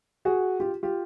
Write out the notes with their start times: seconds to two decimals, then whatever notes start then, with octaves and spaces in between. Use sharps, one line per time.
0.25 F#4 G#4
0.60 F4 G4
0.83 F4 G4